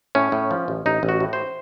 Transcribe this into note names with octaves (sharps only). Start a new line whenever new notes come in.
A2 C#4
A2
F3
A1
A1 D#4
A1
F#4
A2
C5